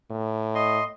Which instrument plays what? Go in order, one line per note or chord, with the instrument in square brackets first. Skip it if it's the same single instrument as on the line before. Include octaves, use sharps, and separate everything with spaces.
[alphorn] A2
[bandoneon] D#5 C6